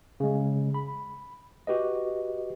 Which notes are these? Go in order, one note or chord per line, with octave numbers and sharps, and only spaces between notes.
C#3 G#3
B5
F#4 G4 B4 D#5